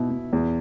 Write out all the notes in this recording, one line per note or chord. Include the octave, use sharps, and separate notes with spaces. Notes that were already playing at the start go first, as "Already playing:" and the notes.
Already playing: B2 E4
B2
E2